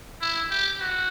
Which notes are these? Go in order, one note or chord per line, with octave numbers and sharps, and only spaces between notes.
E4
G4
F#4